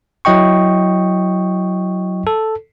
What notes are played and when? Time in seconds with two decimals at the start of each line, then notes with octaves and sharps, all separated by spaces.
0.25 F#3 E4 D#5 G5 C#6
2.27 A4